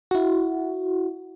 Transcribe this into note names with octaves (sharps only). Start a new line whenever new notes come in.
E4 F#4